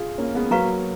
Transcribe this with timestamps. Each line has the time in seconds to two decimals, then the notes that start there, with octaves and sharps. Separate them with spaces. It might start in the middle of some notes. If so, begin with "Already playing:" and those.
Already playing: F4 G#4
0.18 A#3 C#4
0.35 G#3 B3
0.51 F#3 A#3 F#4 B4 F5 A#5 C#6